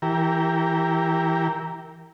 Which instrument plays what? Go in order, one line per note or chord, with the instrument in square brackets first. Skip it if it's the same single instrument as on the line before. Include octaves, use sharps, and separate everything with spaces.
[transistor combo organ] E3 G4 A#4